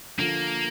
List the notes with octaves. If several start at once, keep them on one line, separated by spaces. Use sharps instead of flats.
D3 F3 A#3